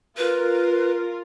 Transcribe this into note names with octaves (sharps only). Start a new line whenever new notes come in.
F4 A#4 B4